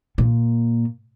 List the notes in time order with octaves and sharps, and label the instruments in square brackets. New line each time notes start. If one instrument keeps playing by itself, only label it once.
[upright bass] A#2